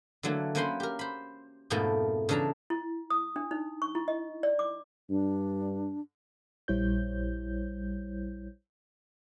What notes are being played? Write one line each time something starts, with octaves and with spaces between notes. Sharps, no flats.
D3 E3 F#3 A3 A#3
F#3 A#3 C#4 C5 B5 C6
G4 A#4
C5 B5
F2 G#2 B2 F3 A3 A#3
C#3 E3 D4 A4 A#5
E4
D#6
D4
D#4
C#6
E4
D#5
D5
D6
G2 D4
A#1 G3 E4 C5 C#5 G6